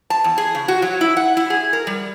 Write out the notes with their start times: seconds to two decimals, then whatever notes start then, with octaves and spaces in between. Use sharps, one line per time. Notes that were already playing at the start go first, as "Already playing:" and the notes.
0.10 A5
0.24 E2
0.38 G#4
0.55 C#3
0.68 F#4
0.82 F#3
1.01 E4
1.17 F#5
1.37 E4
1.50 G#4
1.73 A#4
1.87 G3